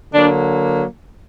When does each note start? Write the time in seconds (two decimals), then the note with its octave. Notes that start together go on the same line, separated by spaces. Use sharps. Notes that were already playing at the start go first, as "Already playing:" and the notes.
0.13 D3 F#3 A#3 D4